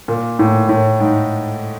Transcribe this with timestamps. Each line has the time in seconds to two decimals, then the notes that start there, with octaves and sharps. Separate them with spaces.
0.08 A#2
0.39 A2
0.69 A2
1.00 G#2